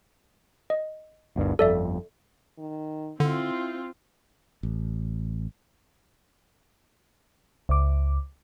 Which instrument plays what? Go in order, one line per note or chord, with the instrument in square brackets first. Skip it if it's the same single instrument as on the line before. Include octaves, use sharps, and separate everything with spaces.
[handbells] D#5
[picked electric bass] G1 D2 G2
[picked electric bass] G1 F2 [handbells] A4 D5 E5
[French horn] D#3
[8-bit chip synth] D3 [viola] C4 F4 [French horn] E4
[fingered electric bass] A1
[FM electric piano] C#2 D6